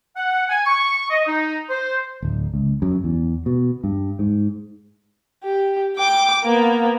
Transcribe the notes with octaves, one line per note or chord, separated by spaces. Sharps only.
F#5
G#5
C#6
D#5
D#4
C5
D1
C#2
F#2
E2
B2
G2
G#2
G4
G5 D6
A#3 B3